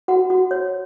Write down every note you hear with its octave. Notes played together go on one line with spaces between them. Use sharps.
F#4 F#5
F#4
C#5